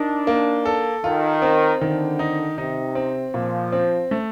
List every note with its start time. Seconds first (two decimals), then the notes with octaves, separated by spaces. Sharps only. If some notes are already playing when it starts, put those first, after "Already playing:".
Already playing: D4 D#4 A#4
0.27 A#3
0.65 A4
1.04 D#3 F4
1.42 C4
1.81 D3 D#3
2.19 D#4
2.58 C3 D#4
2.95 C4
3.34 A#2 F3
3.72 C4
4.11 A3